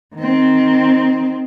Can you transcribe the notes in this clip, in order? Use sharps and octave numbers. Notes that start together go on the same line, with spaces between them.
D#3 C4